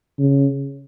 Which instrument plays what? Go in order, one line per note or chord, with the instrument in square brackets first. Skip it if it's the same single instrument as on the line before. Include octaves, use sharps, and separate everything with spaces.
[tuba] C#3